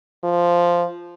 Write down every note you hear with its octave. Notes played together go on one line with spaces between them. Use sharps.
F3